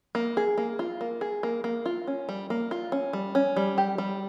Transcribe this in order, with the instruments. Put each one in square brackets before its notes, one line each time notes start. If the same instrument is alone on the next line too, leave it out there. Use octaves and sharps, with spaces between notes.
[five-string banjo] A#3
G#4
A#3
F4
A#3
G#4
A#3
A#3
F4
C#4
G3
A#3
F4
C#4
G3
C#4
G3
G4
G3